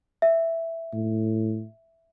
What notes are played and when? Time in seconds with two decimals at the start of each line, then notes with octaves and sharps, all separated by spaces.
0.22 E5
0.93 A2